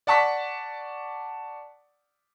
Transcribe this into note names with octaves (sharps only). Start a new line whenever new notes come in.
D5 F#5 A5 C#6 B6